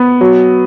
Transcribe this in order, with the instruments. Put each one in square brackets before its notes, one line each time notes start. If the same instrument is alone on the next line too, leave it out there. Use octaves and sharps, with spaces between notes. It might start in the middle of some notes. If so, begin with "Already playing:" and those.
Already playing: [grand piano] B3
F#3